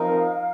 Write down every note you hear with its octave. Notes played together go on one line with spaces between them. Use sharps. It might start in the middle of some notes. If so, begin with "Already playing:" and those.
Already playing: F3 C4 D#4 A#4 F5